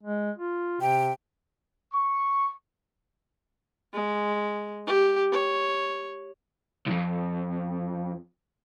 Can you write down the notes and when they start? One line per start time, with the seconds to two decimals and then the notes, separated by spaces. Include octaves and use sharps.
0.03 G#3
0.38 F4
0.81 C3 G5
1.93 C#6
3.94 G#3
4.86 G4
5.32 C#5
6.87 C2 F2